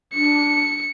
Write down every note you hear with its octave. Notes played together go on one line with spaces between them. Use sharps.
D4 C#7